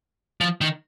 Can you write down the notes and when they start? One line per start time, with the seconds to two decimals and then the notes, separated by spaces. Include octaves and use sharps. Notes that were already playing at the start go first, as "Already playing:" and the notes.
0.41 F3
0.61 D#3